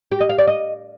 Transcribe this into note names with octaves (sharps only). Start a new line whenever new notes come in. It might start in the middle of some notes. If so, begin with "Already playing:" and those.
G4
D#5
F5
D5
D#5